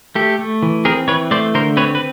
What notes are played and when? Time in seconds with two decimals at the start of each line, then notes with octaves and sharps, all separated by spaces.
0.15 A3 G4 A4
0.39 A3
0.63 E3
0.85 C4 G#4 A#4
1.07 E3 B4 C#5
1.31 A3 C5 D5
1.54 D3 A#4 C5
1.77 C4 B4 C#5
1.95 B4